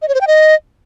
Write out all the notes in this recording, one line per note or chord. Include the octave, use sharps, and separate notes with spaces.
D#5
C#5
C5
G5
D#5